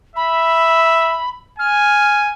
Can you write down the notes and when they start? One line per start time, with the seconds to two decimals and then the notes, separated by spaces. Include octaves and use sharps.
0.16 E5 B5
1.59 G#5 F6